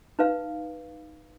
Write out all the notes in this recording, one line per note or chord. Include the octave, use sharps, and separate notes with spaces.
D#4 B4 F5